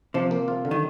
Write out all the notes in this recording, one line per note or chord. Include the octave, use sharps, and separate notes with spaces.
C3 F3
A#3
F4
D3
D#3